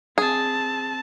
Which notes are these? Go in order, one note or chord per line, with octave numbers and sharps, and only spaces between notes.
C4 G#4 A5